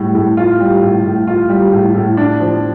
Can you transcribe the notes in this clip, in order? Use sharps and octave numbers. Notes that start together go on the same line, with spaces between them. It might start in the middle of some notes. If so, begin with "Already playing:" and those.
Already playing: A2 G3
A2
F4
G3
A2
A2
F4
G3
A2
A2
D4
F3